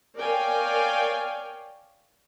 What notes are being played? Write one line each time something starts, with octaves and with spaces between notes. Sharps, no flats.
A#4 C#5 D5 F5 G5 G#5